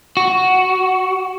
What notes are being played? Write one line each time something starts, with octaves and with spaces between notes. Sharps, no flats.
F#4